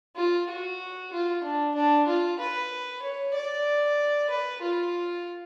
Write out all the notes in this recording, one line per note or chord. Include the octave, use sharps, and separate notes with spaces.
F4
F#4
F4
D4
D4
F4
B4
C#5
D5
B4
F4